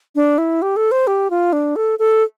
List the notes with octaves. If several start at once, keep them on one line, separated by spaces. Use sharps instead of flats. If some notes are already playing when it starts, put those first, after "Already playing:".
D4
E4
G4
A4
C5
G4
F4
D4
A4
A4